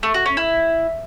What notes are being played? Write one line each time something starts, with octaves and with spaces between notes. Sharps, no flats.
A3
F#4
C#4
E4